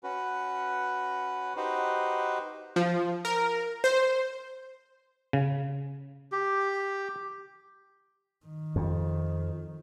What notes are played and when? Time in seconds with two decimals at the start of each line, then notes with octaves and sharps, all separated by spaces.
0.03 C#4 F#4 B4
1.57 D#4 F#4 G4 B4 C5
2.76 F3
3.25 A#4
3.84 C5
5.33 C#3
6.32 G4
8.46 D#3
8.76 F2